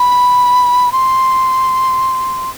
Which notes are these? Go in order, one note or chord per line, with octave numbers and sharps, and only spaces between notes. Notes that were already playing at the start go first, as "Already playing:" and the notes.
Already playing: B5
C6